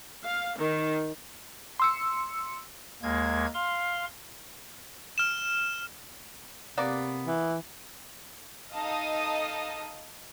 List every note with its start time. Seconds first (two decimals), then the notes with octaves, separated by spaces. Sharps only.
0.24 F5
0.57 D#3
1.80 C6 E6 C#7
3.02 D#2 G#3 A#3 G#6
3.54 F5 C6
5.18 F6 E7
6.77 C3 A#3 B3 D5
7.27 E3
8.74 D#4 A4 D#5 F5 A5 D#6